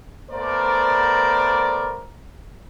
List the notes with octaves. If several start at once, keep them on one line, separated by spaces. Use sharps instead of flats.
A3 B3 A#4 C5 D5